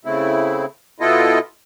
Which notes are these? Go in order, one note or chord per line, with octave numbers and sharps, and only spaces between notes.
C#3 A3 C4 E4
B2 B3 E4 F4 A4 D#5